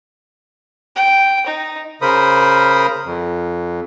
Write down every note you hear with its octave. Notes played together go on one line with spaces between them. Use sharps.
G5
D#4
C#3 A#4 C5 B5 D#6
F2